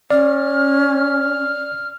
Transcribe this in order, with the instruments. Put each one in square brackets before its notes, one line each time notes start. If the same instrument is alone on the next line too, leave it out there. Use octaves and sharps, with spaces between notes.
[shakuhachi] C#4 [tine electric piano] D5 [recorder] F6